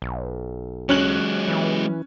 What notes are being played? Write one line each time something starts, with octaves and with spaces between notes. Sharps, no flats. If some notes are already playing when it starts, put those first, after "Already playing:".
B1
F#3 G#3 C#4 F#6 F#7
E3